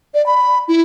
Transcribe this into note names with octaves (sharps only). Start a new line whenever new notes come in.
D5
B5
E4